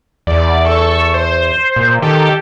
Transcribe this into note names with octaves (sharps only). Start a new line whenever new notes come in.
E2 D5
A4 C#6 E6
C5
A#2
D#3 G4 A4